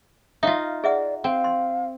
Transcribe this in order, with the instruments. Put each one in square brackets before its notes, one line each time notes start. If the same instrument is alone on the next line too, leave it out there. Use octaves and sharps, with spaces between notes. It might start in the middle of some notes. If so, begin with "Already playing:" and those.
[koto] D#4 F4 [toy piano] E5 F5
[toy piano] G#4 E5 F#5 [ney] D5
[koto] C4 [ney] F5
[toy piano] C6